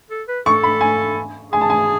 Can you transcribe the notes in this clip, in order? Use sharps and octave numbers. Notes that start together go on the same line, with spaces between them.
A4
B4
A4 C#6
B5
G#5
G#4 G#5
A5
G#5